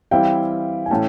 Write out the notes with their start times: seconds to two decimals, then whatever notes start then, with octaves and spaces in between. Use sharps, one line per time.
0.11 E3 G3 C4 E4 F5 G5
0.86 G#5
0.90 A2 E3 A3 C#4 G5 A5